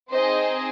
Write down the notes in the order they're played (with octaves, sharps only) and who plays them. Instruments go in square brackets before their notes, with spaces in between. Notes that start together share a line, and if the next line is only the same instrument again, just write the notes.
[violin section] C4 D#4 G#4 C5 D#5